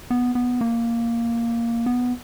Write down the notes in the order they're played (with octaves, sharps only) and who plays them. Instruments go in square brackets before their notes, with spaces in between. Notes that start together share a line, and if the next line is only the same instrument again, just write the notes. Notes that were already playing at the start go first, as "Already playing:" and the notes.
[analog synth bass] B3
B3
A#3
B3